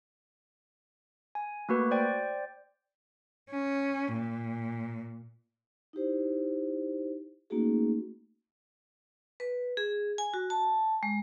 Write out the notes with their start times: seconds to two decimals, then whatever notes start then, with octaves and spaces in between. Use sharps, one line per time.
1.35 G#5
1.69 A3 A#3 F#4 B4
1.91 C5 D5 G5
3.51 C#4
4.14 A#2
5.93 D#4 E4 G4 C5
7.50 A3 A#3 C#4 D#4 F#4 G#4
9.40 B4
9.77 G#4
10.18 G#5
10.34 F#4
10.50 A5
11.03 G#3